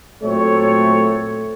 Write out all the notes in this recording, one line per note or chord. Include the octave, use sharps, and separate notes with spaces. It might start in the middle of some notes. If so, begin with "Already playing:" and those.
A#2 F#3 A3 C4 C#5